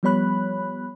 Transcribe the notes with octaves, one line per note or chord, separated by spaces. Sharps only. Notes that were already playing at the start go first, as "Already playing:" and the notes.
F3 G3 B3 C#5 B5 F#6